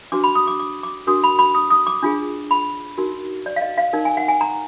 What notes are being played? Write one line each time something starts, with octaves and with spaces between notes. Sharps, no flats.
D4 F#4 B4 D6
B5
D#6
D6
D6
D6
D4 F#4 A#4 D#6
B5
B5
D#6
D#6
D6
D4 F4 G#4
B5
D#4 F#4 A#4
D5
F5
D#5
F5
D#4 A#4
G#5
F#5
G#5
A#5